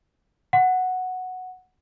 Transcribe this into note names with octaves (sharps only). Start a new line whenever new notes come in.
F#5